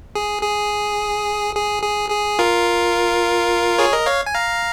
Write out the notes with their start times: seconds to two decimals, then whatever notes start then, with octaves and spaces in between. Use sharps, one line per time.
0.15 G#4
0.43 G#4
1.55 G#4
1.83 G#4
2.10 G#4
2.39 F4 A#4
3.78 G#4 C#5
3.93 A#4 D#5
4.06 C#5 F5
4.26 G#5
4.34 F5 A#5